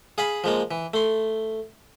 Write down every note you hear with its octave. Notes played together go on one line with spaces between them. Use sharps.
G#4 F5 G#5 B5
F3 G#3 A#3
E3
A3 C6